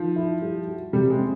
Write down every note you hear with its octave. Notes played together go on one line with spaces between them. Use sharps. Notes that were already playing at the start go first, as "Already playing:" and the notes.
Already playing: D#3 F3
E4
G3
F#4
C3 G3
G#3
C4